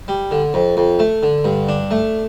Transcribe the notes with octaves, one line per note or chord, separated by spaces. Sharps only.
G3
D3
F2
F2
A3
D3
G2
D4
A3